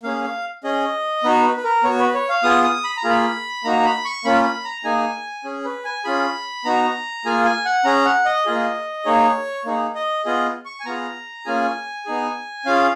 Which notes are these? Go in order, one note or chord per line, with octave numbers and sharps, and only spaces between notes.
A#3 C#4 G#4 F5
F5
C#4 G#4 D#5
B3 D#4 F#4 B4
B4
B4
A#4
B3 F#4 C#5
B4
C#5
F5
B3 F4 G#4 D#6
D#6
B5
A#5
A#3 F4 G#4
B5
A#3 D#4 F#4 A#5
B5
C#6
A#3 C#4 F4 B5
B5
A#5
A#3 D#4 G#4 G#5
C#4 G#4
B4
G#5
C#4 F4 G#4 B5
B3 D#4 F#4 A#5
A#3 F4 G#4 G#5
G#5
F#5
C#4 G#4 A#5
F#5
D#5
A#3 F4 G#4
A#3 D#4 G#4 C#5
A#3 D#4 G#4
D#5
B3 F4 G#4 D#5
C#6
G#5
B3 F4 G#4 A#5
A#3 C#4 F4 G#4 G#5
B3 D#4 G#4
C#4 F4 G#4 F5